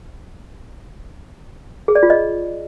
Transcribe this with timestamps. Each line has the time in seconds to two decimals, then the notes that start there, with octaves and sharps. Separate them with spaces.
1.88 G#4
1.95 D5
2.03 F4
2.10 D#5